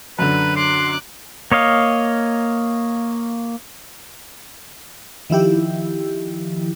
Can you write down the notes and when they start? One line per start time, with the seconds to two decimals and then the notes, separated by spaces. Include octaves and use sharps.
0.19 F#2 D3 B4
0.56 C6 D6 F#6
1.52 A#3 C#5 D#5 F5
5.30 D#3 F3 E4 G4